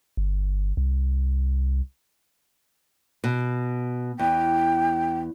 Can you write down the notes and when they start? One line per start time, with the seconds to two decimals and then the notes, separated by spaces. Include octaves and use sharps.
0.17 G1
0.77 C2
3.24 B2
4.19 E2 G5